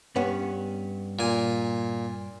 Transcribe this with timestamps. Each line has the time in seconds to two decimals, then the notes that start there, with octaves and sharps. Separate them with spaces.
0.16 G2 B3 C#4
1.19 A#2 G#5